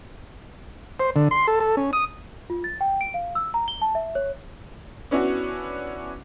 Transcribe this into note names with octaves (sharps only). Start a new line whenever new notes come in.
C5
D3
C6
A4
A4
C#4
D#6
F4
A6
G5
D7
F5
E6
A#5
G7
A5
E5
C#5
B3 C#4 D4 E4 F#4